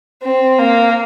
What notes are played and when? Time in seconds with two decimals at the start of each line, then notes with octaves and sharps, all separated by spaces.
0.23 C4
0.58 A#3